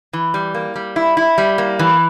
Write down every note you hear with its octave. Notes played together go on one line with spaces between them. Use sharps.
E3
G3
A#3
G3
E4
E4
G3
A#3
E3